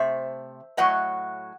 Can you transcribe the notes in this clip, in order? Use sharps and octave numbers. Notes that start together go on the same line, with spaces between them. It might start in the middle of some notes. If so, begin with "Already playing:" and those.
Already playing: C3 A3 C5 E5
A2 F#3 A3 D#5 F#5